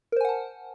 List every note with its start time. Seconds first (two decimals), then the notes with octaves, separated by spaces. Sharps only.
0.12 A#4
0.16 C5
0.21 G#5
0.25 F#5
0.29 A5